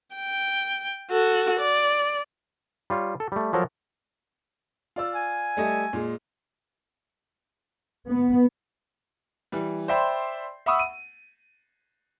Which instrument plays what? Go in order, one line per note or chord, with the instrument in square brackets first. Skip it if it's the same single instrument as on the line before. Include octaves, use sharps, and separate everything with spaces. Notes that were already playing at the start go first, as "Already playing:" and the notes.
[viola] G5
F#4 A4
D5
[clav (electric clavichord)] G3 F4 C#5
A4
G3 A3
F3 F#3 A4 A#4 A#5
[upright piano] F4 D5 E6
[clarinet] G#5
[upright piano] G3 A3 D#5
A#2 G#3
[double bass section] B3
[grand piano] E3 G3
C5 D5 E5 G5 B5 C6
E5 F#5 B5 C#6 D#6 E6
D#7